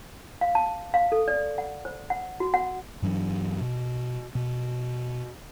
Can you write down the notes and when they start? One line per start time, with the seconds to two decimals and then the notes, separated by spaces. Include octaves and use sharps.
0.41 F5
0.55 A5
0.94 F5
1.12 A4
1.28 D5
1.58 F#5
1.85 C5
2.10 F#5
2.40 F#4
2.54 F#5
3.02 G2 E3 F#3 D4
3.61 B2
4.35 B2